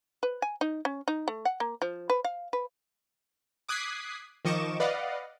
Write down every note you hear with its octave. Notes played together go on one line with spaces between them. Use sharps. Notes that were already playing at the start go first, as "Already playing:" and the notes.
B4
G#5
D#4
C#4
D#4
A3
F#5
A#3
F3
B4
F5
B4
D6 D#6 F#6 G#6 B6 C7
D#3 F3 D#5 C#6 D6 E7
B4 D5 D#5 F5 F#5